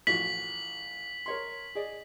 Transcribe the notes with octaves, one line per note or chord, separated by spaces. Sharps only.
A1 F3 F#4 B6 F#7
A#4 C#5 C6
G#4 D5 D#5